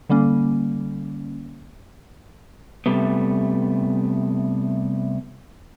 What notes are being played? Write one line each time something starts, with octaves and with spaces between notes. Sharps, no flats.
D3 G3 A#3 C#4
C3 G3 A3 B3